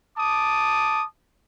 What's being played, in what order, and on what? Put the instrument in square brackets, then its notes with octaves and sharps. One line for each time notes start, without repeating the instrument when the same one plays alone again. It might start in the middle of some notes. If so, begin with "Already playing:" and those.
[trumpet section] A5 D6 D#6